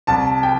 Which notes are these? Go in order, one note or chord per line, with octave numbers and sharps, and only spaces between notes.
C2 A5
G5